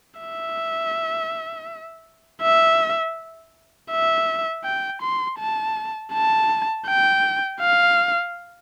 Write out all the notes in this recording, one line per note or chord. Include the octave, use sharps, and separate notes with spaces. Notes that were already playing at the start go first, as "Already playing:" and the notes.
E5
E5
E5
G5
C6
A5
A5
G5
F5